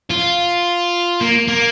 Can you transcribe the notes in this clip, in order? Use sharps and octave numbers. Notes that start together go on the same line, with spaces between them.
F4
A#3
A#3